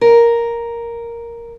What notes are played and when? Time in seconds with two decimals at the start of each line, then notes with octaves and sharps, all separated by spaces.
0.01 A#4